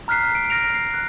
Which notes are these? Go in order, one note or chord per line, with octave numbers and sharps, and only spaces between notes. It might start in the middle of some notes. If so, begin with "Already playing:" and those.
A#5 F6 F#6 B6 C7
D7
F6 A#6 D7 F7
C7
F#6